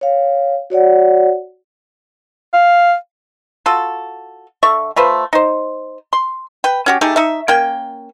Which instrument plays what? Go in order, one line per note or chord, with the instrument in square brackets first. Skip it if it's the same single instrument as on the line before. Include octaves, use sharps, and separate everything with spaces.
[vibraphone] C#5 F5
F#4 C#5 D5 F#5
[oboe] F5
[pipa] F4 F#4 A4
D3 A4 E5 C#6
A3 F4 B4 C5
D#4 C5
C6
B4 G5
C#4 F#4 G4
A3 D#4 G4 G#4
D#4 E5
A#3 C#4 G5